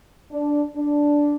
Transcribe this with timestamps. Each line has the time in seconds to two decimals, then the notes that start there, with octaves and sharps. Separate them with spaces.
0.32 D4
0.76 D4